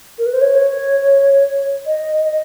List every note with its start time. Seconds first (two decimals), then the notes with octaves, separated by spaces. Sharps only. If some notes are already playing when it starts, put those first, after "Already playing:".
0.18 A#4
0.26 B4
0.33 C5
0.41 C#5
1.87 D#5
2.23 D#5